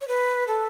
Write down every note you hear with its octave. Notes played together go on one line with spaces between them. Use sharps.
C#5
B4
A4